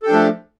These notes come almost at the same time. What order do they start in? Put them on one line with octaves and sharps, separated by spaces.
A4 G4 D4 F3 A3